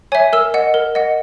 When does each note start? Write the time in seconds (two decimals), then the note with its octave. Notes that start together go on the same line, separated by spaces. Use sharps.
0.12 C#5 E5 G#5
0.33 A#4 E6
0.54 D#5 F#5
0.74 A#4
0.95 D#5 F#5